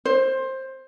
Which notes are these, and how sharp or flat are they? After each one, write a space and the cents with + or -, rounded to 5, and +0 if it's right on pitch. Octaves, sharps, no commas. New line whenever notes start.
C5 +15